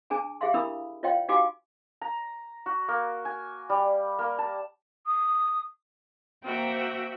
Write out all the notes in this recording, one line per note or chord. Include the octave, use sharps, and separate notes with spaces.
D4 G#4 G#5 A5
G4 G#4 E5 F5 C6
D4 E4 A#4 B5 D#6 E6
F4 C#5 D#5 F5 G5 C6
D#4 F#4 G4 F5 G#5 D6
A#5
F#4
A#3
G#5
G3
A#3
A5
D#6
A#3 C4 F#4 E5 G5 A#5